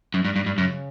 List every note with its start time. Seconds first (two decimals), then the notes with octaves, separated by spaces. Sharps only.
0.14 F#2
0.25 G2
0.36 G2
0.46 G2
0.58 F#2 C#3